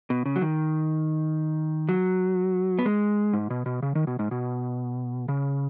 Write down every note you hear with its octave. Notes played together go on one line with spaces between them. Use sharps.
B2
C#3
F#3
D#3
F#3
B3
G#3
G#2
B2
B2
C#3
D#3
B2
G#2
B2
C#3